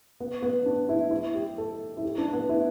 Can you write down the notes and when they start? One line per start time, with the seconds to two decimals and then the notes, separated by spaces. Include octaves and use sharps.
0.20 B3
0.42 B3
0.65 D4
0.89 E4
1.11 E4
1.35 G4
1.58 A4
1.97 E4
2.04 G4
2.18 D4
2.33 B3
2.49 E4